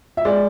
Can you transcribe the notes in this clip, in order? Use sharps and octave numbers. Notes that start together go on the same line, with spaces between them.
E5
G#3 D5